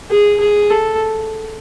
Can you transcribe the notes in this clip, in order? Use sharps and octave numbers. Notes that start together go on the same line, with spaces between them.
G#4
G#4
A4